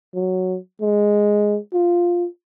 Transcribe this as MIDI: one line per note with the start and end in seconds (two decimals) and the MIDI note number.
0.15 0.57 54
0.81 1.58 56
1.73 2.26 65